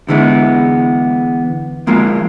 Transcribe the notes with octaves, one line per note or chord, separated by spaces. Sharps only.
D3 E3 G#3 B3
F3 G#3 A#3 F4